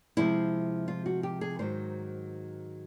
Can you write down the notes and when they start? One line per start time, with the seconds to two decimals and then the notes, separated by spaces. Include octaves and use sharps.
0.17 C3 F3 G#3 C4 E4
0.88 F4
1.06 F#4
1.23 G4
1.41 G#4
1.59 G#2 D#3 F#3 C5